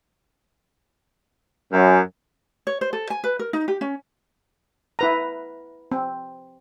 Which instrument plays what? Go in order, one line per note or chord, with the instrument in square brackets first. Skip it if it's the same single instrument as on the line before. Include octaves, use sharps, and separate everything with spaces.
[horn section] F#2
[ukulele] C#5
C5
A4
G#5
B4
A#4
D#4
G4
C#4
[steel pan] E4 B4 A#5
C4